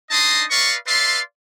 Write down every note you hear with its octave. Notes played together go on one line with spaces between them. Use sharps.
D4 D#4 D#5 A5 C6 D#6
B4 D5 D#5 F5 C#6
B4 D5 E5 F5 C6